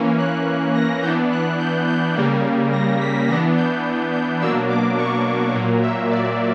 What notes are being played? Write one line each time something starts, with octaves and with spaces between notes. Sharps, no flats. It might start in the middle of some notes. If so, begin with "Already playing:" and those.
Already playing: E3 A#3 C#4
F#6
A#6
E3 B3 D4 G6
F#6
G6
G6
C#3 G3 A#3
A#6
B6
E3 B3 D4 A#6
G6
G6
B2 F#3 A#3 D4 E6
D6
C#6
A#2 F#3 A#3
E5
D5